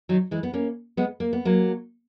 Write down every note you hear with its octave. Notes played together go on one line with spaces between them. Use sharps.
D#3 F#3
E3 G#3
B3
A#3 C#4
G#3 B3
A#3
B3
F#3 A#3